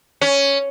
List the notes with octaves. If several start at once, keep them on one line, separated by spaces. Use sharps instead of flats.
C#4